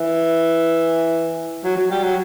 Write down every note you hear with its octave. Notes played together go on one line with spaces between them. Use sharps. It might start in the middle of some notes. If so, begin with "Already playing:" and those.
Already playing: E3
F#3
F#3
G3
F#3